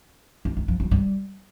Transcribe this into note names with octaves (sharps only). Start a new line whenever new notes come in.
D4
G#3
F3
F#3
G3